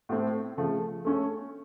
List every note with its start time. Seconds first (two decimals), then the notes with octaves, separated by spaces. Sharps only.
0.09 A2 A3 C4
0.57 C#3 F3 A3
1.05 A3 C#4 A4